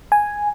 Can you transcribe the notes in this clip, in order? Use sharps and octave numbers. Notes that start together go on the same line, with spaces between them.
G#5